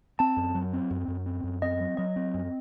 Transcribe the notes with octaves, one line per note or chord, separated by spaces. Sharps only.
C4 A5
F#2
F#3
C4
F#2
F#2
C4
F#2
C4 D#5
F#3
F#3 D#5
C4
F#2